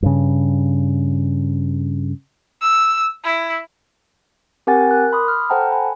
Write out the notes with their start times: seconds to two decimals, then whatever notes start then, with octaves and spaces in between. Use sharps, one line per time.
0.03 G2 C#3
2.62 E6
3.24 E4
4.67 C4 G4 A#4 F#5 G#5 A6
4.89 A#4 F#6
5.13 B5 C6 D6 D#6
5.28 F6
5.50 A4 C5 F#5 G5 A5 A#5
5.71 G#5 B5